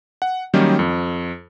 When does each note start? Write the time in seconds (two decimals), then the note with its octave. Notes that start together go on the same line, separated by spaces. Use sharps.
0.22 F#5
0.54 D#3 F#3 G3 A#3 C#4 D#4
0.79 F2